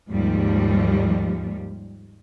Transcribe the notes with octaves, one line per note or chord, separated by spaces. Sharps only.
D#2 G#2 F3 G3